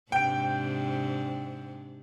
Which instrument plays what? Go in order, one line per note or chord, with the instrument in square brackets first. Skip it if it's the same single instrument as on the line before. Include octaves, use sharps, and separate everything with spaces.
[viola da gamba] G#2 C3 D4 [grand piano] G5 D7